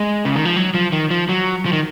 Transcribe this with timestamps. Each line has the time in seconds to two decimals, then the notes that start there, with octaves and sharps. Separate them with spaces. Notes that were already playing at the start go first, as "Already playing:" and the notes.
Already playing: G#3
0.25 C#3
0.36 D#3
0.45 F3
0.57 F#3
0.74 F3
0.92 D#3
1.11 F3
1.29 F#3
1.65 F3
1.73 D#3